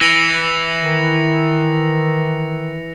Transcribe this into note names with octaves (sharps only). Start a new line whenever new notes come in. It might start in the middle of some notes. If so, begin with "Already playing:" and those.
E3 A#6 C#7 F7
D#3